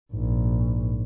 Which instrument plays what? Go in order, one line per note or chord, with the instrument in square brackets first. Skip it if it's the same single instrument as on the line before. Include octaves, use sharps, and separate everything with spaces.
[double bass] A#1 [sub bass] G#2